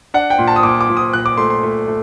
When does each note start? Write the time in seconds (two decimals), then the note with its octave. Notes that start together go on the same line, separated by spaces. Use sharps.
0.14 D4 F#5
0.30 G5
0.38 A#2
0.48 A5
0.56 D#6
0.63 A#2 D6
0.81 D6
0.89 A#2
0.97 D#6
1.13 A#2 F#6
1.26 D6
1.37 A3 C6
1.50 C6
1.63 A3
1.88 A3